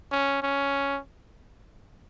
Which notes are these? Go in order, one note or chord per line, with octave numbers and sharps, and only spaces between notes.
C#4
C#4